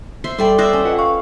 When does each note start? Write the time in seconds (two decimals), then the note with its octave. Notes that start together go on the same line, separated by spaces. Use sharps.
0.24 C5 E5 C6 C7
0.39 G3 A4 D5 E5 G5 C6
0.58 C5 D5 E5 D#6 F#6 A#6
0.73 C#4
0.85 F4 B4 D#5 F#5
0.99 F5 C#6